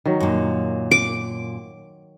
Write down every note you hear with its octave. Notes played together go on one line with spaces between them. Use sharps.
D#3 F#3
F#2 A#2
D6